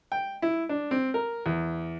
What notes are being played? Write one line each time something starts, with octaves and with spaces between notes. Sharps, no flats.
G5
E4
D4
C4
A#4
E2